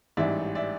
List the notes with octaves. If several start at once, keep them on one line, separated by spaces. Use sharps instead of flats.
A1 G#2 E3 G3 D5 E5
D5 E5